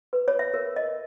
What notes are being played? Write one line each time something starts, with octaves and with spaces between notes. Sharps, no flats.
B4
C#5
E5
A#4
D#5